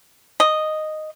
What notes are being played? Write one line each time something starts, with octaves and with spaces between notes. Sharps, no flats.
D#5